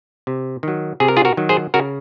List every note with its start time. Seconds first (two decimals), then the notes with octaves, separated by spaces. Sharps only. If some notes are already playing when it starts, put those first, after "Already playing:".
0.27 C3
0.63 D#3 F#3
1.00 C3 G#4
1.08 A#4
1.17 F4 G#4
1.25 F#4 A#4
1.37 D#3 F#3
1.49 G#4 C5
1.74 C#3 F#4 A#4